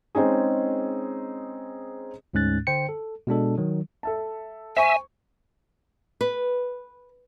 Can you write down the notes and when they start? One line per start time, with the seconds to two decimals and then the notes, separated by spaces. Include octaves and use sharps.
0.15 G#3 C4 C#4 D#4 G#4
2.34 D2 G#2 G#3 C#4 F#6 A6
2.67 D3 C5 G5 C#7
2.89 A4
3.27 B2 G#3 D4 A4
3.58 D#3 F#3
4.03 A4 E5 A5
4.77 C5 E5 G#5 C#6
6.21 B4